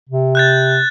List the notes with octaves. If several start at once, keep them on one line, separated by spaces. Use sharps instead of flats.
C3
F#6 G6 A6